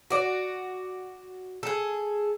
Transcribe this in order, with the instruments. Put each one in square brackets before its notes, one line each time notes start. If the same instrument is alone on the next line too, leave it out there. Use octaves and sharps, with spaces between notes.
[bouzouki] F#4 D5
G#4 A4